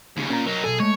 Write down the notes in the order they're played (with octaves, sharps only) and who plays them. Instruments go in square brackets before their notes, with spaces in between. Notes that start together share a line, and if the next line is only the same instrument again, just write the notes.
[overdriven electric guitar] D#2 C#3
[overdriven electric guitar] A#2 [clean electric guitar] C#4 A#5
[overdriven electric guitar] F#3 D#4 [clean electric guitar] A#4
[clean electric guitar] B1 A#2 A4 [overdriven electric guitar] G#4
[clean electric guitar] G#3 A3 [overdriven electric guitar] C#5